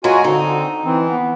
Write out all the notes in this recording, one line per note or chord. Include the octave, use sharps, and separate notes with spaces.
F#3 G#3 F4 F#4 G#5
D3 C4 D#4
E3 C4
B3